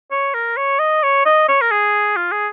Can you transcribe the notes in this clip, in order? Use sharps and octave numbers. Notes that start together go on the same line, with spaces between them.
C#5
A#4
C#5
D#5
C#5
D#5
C#5
A#4
G#4
F4
G#4